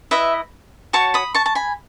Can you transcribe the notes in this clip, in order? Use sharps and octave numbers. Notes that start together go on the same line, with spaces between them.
E4 B4 D#5 E5
F#4 C#5 A5 C#6
B5 D#6
A5 C#6
A5
G#5 B5